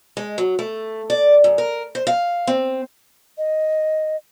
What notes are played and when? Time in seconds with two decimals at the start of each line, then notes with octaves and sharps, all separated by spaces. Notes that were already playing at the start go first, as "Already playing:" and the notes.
0.17 G#3
0.38 F#3
0.59 A3
1.10 D5
1.44 F#2
1.58 A#4
1.95 C5
2.07 F5
2.47 C4
3.37 D#5